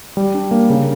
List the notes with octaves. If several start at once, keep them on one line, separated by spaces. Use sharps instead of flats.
G3
D4
A#3
C#3